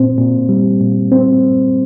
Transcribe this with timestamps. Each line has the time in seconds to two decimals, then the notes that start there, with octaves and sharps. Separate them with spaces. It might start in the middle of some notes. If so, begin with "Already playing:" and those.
Already playing: A#2 C4
0.18 A#2
0.49 G3
0.81 A#2
1.12 C4